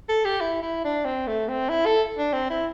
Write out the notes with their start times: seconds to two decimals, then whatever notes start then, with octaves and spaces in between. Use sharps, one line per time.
0.09 A4
0.25 G4
0.41 E4
0.62 E4
0.84 D4
1.05 C4
1.27 A3
1.48 C4
1.69 E4
1.86 A4
2.18 D4
2.33 C4
2.50 E4